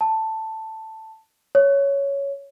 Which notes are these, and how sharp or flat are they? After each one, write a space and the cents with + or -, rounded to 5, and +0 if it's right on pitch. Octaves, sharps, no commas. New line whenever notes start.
A5 +5
C#5 +5